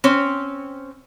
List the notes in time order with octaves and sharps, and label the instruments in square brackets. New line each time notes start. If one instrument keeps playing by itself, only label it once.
[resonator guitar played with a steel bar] C4 C#4